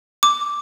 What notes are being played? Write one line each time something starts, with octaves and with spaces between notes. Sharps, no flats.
D6